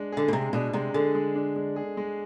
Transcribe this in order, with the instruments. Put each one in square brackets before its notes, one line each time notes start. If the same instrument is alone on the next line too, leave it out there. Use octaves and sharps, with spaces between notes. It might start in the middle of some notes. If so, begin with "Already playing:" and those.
Already playing: [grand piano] G#3 D4
[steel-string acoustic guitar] D3 [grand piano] G#4
[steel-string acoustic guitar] B2
[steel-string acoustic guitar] C3 [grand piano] G#3
[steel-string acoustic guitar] B2 [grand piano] D4
[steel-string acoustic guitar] C3 [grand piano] G#3
[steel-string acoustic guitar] D3 [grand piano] G#4
[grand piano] G#3
D4
G#3
G#4
G#3